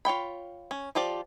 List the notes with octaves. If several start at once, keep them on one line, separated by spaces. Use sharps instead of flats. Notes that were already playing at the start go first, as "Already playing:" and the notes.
F4 C#5 G5 B5
C#4
F3 F4 G4 D5